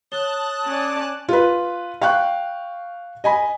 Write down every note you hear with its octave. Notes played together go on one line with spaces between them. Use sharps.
C#5 A5 D#6 F#6 G7
C#4 D5
F4 B4
F5 G5 C#6 F#6
D#5 G#5 B5